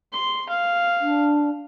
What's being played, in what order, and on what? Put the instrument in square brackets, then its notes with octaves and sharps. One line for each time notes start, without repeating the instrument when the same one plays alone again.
[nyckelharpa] C6
F5
[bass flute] D4